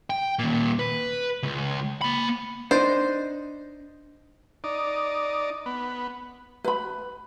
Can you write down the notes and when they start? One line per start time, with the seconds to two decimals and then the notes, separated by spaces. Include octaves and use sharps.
0.10 G5
0.39 D#2 A#2
0.79 B4
1.43 C#2
2.02 A#3 B5
2.71 D4 D#4 C5
4.64 D#4 D5
5.66 B3
6.64 B4 B5